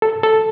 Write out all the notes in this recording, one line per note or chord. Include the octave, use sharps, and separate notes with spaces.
A4
A4